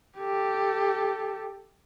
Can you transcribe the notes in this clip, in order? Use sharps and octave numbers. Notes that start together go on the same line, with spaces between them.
G4 A4